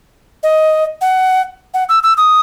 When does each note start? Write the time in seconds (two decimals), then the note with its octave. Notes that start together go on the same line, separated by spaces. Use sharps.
0.43 D#5
1.01 F#5
1.74 F#5
1.89 E6
2.03 E6
2.17 D#6